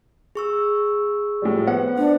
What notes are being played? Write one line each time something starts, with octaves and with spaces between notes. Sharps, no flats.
G#4 C#6 E6
A2 F3 G3
B3 C5 F#5
D4 C5